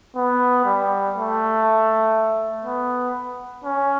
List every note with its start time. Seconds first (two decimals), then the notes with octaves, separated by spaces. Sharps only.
0.16 B3
0.65 G3
1.16 A3
2.65 B3
3.64 C#4